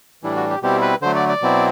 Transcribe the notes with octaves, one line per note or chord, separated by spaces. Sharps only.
A2 E3 G3 D4 E4
F#4
G4
B2 G3 C4 E4 G4
B4
D3 F#3 A3 C5
D5
D5
B2 F#3 C4 E4